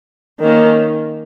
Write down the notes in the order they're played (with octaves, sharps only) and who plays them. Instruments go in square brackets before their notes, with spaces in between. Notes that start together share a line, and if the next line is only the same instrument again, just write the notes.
[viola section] D#3 A#3 C#4